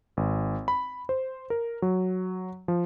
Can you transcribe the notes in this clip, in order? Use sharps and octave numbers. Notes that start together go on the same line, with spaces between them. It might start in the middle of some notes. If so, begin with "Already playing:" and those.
G#1
B5
C5
A#4
F#3
F3